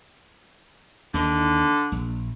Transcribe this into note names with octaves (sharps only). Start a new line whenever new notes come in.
D#2 D3 D#3
A#1